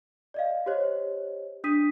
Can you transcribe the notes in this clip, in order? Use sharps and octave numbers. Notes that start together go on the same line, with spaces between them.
D5 D#5 F5
G4 C5 C#5 D#5
D4 D#6 B6 D#7